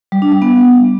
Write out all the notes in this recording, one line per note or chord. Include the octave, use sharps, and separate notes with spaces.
G3
D4
G3
B3